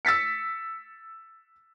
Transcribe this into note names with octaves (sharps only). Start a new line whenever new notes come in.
E6 A6 B6 C#7